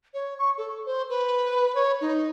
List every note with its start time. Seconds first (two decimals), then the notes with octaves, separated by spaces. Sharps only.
0.14 C#5
0.39 C#6
0.58 A4
0.85 C5
1.10 B4
1.75 C#5
2.01 D#4